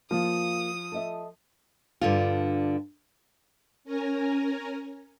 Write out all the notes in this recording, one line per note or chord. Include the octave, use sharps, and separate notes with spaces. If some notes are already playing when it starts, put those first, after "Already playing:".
F3 A#3 F4 D#6
A4 D#5 E5
G2 D3 F4
C#4 A#4 G#5 A#5